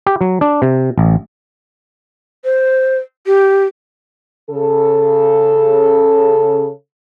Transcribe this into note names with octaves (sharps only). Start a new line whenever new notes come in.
G4
F#3
D4
C3
A1
C5
G4
C#3 A4